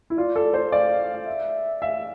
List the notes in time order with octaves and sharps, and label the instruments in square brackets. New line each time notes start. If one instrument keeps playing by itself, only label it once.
[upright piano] E4
[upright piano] F4 [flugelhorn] D5
[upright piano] A4
C5
[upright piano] D5 [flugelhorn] F5
[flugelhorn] E5
[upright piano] E5 [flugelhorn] F5